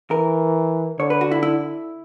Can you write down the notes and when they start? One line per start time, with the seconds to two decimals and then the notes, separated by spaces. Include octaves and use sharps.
0.11 E3 A#4
0.99 D3 C#5
1.10 B4
1.21 F#4
1.31 E4
1.43 E4